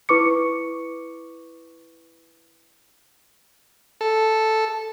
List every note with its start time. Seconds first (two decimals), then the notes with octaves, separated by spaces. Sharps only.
0.09 E4 B4 C#6 D6 C#7
4.01 A4